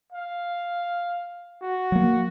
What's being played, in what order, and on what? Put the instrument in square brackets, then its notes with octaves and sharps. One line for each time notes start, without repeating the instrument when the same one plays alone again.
[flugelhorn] F5
F#4
[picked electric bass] F#3 A#3